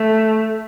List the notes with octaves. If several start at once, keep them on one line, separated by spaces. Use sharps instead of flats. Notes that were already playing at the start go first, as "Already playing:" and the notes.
Already playing: A3